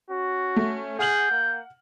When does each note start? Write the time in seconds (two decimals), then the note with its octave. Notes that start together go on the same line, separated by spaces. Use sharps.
0.10 C#4 F#4
0.56 A3
0.99 G#4 F#5 F6 G6 F#7
1.31 A#3